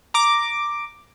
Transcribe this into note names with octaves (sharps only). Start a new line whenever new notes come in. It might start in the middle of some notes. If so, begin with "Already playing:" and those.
A#5 D6